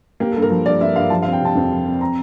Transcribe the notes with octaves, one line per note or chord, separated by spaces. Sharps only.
A#3 G4
A4
G2
A#4
F3
G2 D5
A#3 E5
G2 F5
F3 A5
F5
C4
G5
C3 A5
F2
F3
C4
C4 A#5